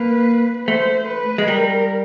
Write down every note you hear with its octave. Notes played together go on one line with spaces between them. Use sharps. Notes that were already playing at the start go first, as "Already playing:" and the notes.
Already playing: A#3 B4
A3 C5
B4
G#3
G3 A#4